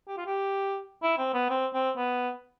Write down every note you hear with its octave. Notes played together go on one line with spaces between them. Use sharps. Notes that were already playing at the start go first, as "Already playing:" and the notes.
G4
F4
G4
E4
C4
B3
C4
C4
B3